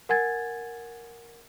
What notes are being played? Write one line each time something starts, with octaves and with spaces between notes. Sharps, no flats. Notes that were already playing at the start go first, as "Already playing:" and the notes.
A#4 F#5 G#5 G#6 A6